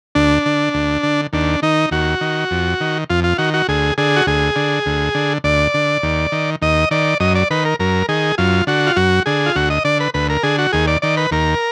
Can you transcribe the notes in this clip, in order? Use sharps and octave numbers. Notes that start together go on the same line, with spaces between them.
D2 D4
D3
D2
D3
D#2 D4
D#3 D#4
D#2 F#4
D#3
F2
D#3
F2 F4
F4
D#3 F#4
F#4
D2 G#4
D3 G#4
F#4
D2 G#4
D3
D2
D3
D2 D5
D3
D#2
D#3
D#2 D#5
D#3 D5
F#2 D#5
D5
D#3 B4
A#4
F#2 A#4
D#3 G#4
F#2 F4
D3 F#4
F4
F#2 F#4
D3 G#4
F4
D2 F#4
D#5
D3 D5
B4
D2 B4
A#4
D3 G#4
F#4
D#2 G#4
D5
D#3 D5
B4
D#2 A#4